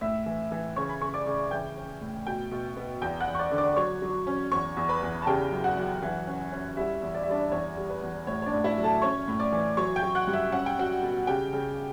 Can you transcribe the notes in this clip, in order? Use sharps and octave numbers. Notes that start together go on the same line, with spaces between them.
A2 E5 E6
E3
E3
C#3 C#5 C#6
B5
C#3 C#6
D5 D6
C#3
E3 G5 G6
C#4
A2
B2 G5 G6
B2
B3
E2 G5 G6
F#5 F#6
E2
C#6
D5 D6
D3
D5 D6
F#3 C#5 C#6
F#3
C#4
E2 C#5 C#6
E2
B4 B5
E2
A5
C#3 G4 G5
F#2
F#4 F#5
F#2
E3
C#4
C#4
G3 E4 E5
E2
D5
E5
G3 D4 D5
E2 C#5
G3
B4
E2
A2 C#5
C#5
D4 D5
A2
E4 E5
F#3
A4 A5
C#4 C#5 C#6
A2
D5 D6
E3
F#3 C#5 C#6
G5 G6
F#3
F#5 F#6
G2
E5 E6
C#4 F#5
G5
C#4 F#4 F#5
B2
C#3 G4 G5
C#3